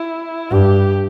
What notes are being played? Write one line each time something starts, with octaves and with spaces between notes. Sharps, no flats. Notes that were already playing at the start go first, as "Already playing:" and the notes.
Already playing: E4
G2 G4